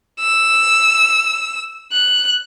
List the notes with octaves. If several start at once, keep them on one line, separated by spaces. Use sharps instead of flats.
E6
F#6